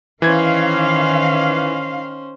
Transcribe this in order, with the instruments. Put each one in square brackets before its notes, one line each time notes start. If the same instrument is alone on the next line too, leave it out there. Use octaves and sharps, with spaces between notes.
[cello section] D#3 F5 [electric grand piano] E3 G#6 [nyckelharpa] C#4 C5